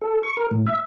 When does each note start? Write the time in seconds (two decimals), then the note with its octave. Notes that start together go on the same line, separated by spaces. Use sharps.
0.01 A4
0.23 C#6
0.37 A#4
0.51 A2
0.66 E5